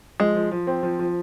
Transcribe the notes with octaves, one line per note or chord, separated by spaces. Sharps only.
F3 G#3
F3
F3
C4
F3
F3